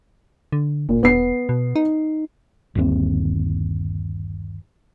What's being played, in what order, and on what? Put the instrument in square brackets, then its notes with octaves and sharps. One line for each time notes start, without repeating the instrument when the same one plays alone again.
[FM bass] D3
[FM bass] F#1 [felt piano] A#2
[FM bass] E1 [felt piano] B3 C7
[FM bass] B2
D#4
[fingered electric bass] G1 D#2 C4